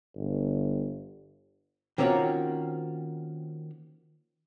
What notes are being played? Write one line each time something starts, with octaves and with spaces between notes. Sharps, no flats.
G1
D#3 A#3 C4 C#4 F4 F#4